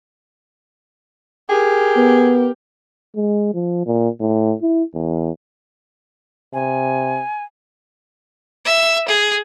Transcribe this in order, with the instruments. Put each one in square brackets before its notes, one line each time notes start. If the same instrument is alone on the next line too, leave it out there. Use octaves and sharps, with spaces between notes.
[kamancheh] G4 A#4 [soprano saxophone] G#4
[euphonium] B3
G#3
F3
A#2
A2
E4
E2
[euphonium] C3 [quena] G#5
[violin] E5
G#4